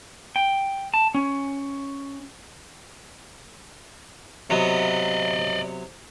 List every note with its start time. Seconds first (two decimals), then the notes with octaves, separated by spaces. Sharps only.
0.36 G5
0.94 A5
1.15 C#4
4.50 C3 F#3 B3 D5 D#5